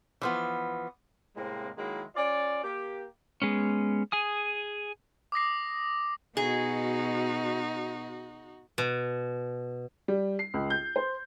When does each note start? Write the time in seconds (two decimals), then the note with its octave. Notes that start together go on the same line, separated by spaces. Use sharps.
0.22 E3 F3 B3
1.36 A2 C3 G#3 A#3 C4
1.78 D#3 F#3 G#3 A#3 E4
2.16 C#4 F4 D5
2.63 A#3 G4
3.42 G#3 B3 C#4
4.12 G#4 G#5 D#6
5.32 D6 D#6 A#6 C7
6.37 B2 D#4 F#4 G#4
8.78 B2
10.08 G3
10.39 C7
10.54 C#2
10.70 G6
10.96 C5